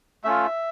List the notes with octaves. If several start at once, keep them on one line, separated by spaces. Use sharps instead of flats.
A3 C#4 F4 E5